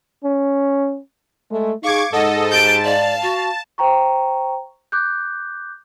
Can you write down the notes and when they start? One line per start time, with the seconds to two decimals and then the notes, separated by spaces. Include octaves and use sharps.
0.24 C#4
1.50 G#3 A3
1.83 D#4 G#4 F5 C#6 D6 G#6
2.12 G#2 A4 D#5 F#5
2.51 G4 A5 G6 D7
2.84 D5 F5
3.22 F#4
3.78 C5 G5 A#5 C#6
4.92 D6 F#6 G6